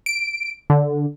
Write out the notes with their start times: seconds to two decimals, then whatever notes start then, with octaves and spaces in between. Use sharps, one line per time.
0.06 D7
0.70 D3